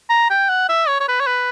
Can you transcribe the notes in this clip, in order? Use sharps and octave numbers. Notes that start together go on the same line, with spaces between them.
A#5
G5
F#5
E5
C#5
C#5
B4
C#5
B4